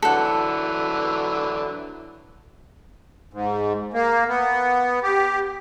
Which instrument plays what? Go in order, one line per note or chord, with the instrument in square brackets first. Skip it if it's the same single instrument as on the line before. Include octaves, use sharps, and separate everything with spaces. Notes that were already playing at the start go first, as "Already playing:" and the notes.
[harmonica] D3 E3 F#3 [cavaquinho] A4 F#5
[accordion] G#2
A#3
B3
G4